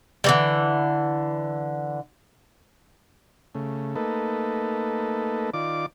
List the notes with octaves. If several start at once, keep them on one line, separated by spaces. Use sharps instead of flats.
D3 E3 G3
C#3 A3
A3 A#3 D#4 A4 B4
D#3 F4 D5 D6